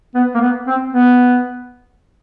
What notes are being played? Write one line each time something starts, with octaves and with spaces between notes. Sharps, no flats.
B3
A#3
B3
C4
B3